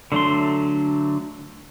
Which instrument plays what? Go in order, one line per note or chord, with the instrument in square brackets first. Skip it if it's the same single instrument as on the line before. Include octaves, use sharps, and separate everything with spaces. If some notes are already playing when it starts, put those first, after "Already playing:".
[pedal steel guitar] D3 F#3 A3 D4 C6